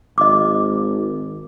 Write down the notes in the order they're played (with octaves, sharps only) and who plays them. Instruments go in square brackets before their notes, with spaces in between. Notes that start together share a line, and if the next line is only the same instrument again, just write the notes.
[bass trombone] G#1 [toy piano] D#5 D6